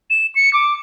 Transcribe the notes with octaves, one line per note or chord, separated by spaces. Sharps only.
E7
C#7
D6